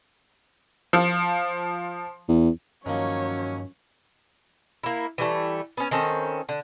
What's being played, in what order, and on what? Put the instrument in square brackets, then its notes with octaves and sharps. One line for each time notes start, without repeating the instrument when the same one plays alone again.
[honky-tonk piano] F3
[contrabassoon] E2
[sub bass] G2 [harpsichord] D#3 F3 A#3 [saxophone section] F#3 C#4 [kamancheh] C#5
[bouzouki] A#3 E4
E3 G3 A3
B3 C#4
D#3 C4 C#4 A4
D3